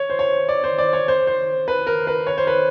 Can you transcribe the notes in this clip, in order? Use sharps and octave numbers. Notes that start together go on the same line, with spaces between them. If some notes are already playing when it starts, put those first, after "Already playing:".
Already playing: C#5
C5
C#5
D5
C5
D5
C#5
C5
C5
B4
A#4
B4
C#5
C5
B4